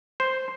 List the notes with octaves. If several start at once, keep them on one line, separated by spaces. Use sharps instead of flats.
C5